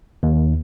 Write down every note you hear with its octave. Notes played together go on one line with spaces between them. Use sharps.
D#2